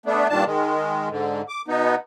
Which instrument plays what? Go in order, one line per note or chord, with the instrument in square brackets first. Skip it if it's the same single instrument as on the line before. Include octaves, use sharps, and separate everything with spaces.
[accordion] A3 B3 D4
G2 A#2 D#3 D4 A5
D#3 G#3
G#2 D3
D6
B2 B3 D#4